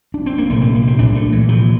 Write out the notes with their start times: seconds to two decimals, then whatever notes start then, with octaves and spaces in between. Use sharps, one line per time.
0.14 D4
0.26 C4
0.38 A#3
0.50 C2 A#2 A3
0.62 C4
0.75 A#3
0.87 C4
0.99 C2 A#2 D4
1.15 A3
1.32 E3
1.48 C2 A#2 F3